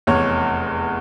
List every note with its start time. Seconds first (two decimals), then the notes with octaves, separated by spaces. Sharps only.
0.07 F1 E2 C#5